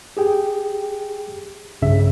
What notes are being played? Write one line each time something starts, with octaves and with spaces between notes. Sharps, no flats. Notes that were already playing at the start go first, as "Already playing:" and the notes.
G4 G#4 G5
B1 G2 C#3 E5